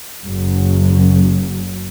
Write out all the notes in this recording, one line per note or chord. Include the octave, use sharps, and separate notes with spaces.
F#1 F#2 F#3